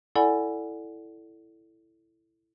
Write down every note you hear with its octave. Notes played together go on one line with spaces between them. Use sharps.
E4 A4 D5 F#5 G#5 B5